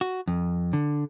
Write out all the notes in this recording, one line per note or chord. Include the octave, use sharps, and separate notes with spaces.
F#4
F2
D3